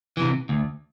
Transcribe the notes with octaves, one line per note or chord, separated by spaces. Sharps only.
C3 E3
D2